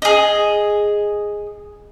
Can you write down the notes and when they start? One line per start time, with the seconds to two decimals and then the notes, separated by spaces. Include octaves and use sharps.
0.02 G#4 D#5